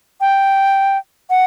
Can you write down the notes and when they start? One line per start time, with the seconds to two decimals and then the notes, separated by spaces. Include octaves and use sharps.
0.21 G5
1.30 F#5